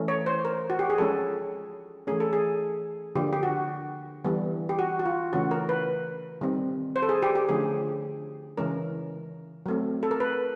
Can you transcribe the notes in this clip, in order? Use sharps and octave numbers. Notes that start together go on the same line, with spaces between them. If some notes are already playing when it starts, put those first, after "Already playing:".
Already playing: E3 A3 C#4
C#5
C5
A#4
F#4
G4
G#4
F3 G#3 C#4 A4
E3 A3 C#4 G#4
A4
G#4
D3 F3 A#3 G4
G4
F#4
E3 G3 B3
G4
F#4
F#4
F4
C#3 E3 A3 C#4 F#4
A#4
B4
D#3 G3 C4
C5
A4
G#4
G4
G4
D3 F3 A3 C#4 G#4
C#3 E3 G#3 C#4 A#4
F#3 A3 C4
A4
A#4
B4